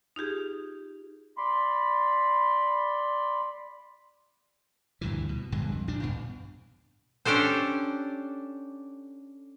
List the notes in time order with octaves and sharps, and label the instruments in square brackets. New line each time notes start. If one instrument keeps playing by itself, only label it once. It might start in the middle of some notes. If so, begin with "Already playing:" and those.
[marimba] D#4 F4 G4 G#4
[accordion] D5 B5 C6
[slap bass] D2 G2 A#2 E3
B2
A#1 G2 D3 G#3
F2
A#1 A#2 D4
G2 B2
[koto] C#4 D4 G4 A4 C5